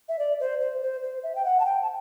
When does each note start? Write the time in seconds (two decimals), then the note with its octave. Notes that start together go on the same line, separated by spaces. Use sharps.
0.08 E5
0.18 D5
0.39 C5
0.60 C5
0.81 C5
1.03 C5
1.23 E5
1.35 G5
1.44 F#5
1.59 A5
1.65 G5
1.81 A5